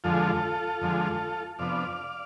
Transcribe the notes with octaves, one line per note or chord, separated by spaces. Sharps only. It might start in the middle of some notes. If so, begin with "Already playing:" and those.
F2 D3 F3 G#3 F4 A4
F2 D3 F3 G#3
F2 C3 F3 B3 D4 D5 F5